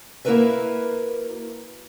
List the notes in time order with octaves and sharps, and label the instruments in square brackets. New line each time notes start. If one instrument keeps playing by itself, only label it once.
[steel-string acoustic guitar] A#3 E4 F#4 A#4 B4 E5